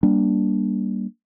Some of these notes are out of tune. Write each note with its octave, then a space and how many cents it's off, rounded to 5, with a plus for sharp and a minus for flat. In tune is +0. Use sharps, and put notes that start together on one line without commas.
G3 +0 A#3 +20 D4 +0